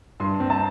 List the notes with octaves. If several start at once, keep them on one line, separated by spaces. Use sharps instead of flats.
G2 C6
C4
A5